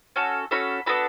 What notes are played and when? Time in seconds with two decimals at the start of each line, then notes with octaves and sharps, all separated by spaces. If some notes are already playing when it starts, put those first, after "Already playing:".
0.16 C#4 F#4 A4
0.51 C#4 F#4 A4 B5
0.86 B3 D4 F#4 A4 B5